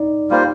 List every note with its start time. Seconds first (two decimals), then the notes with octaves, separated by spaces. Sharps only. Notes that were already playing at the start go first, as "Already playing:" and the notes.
Already playing: D#4 D5
0.30 G3 A#3 F4 C5